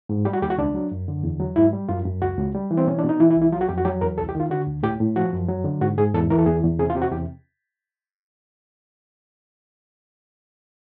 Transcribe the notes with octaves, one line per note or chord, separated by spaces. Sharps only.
G#2
G3 G4
F#4
D#2 G4
F#4
C#2 D4
F#3
F#2
D3
E2
F#3
G#2 E4
G3
F#2 F4
F#2
C#2 F#4
C#2
G3
E3
C4
B2 C#4
D4
B2
D#4
E3 E4
E4
C2
E4
F#3 F4
F#4
F2 G4
F#4
F#3 G4
E2 A#4
C2 A4
G4
D#3
F4
D3 F#4
D2
A2 G4
A2
F3 F#4
F#2
F#3
D3
G#2 F#4
G#2 G#4
E2 A4
E3 A#4
A4
E2 G#4
E2
C3 G#4
F4
C3 G4
F#4
E2 G4